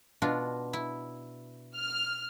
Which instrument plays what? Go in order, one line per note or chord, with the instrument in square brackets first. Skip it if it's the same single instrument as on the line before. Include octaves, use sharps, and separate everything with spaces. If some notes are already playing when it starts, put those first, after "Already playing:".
[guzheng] B2 D4 F4
E4
[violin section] F6